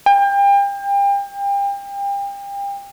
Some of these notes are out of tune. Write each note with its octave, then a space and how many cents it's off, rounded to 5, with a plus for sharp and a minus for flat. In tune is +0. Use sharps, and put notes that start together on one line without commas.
G5 +35